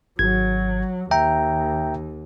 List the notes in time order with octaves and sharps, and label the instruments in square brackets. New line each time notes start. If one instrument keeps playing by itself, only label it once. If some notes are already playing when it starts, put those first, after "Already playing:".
[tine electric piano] G#1 G#6 [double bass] F#3
[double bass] D#2 [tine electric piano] E5 G5 A#5